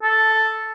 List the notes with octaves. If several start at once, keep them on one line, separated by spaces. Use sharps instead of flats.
A4